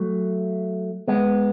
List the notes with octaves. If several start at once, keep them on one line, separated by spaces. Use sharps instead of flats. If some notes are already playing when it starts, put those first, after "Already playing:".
Already playing: F#3 A3
G#3 B3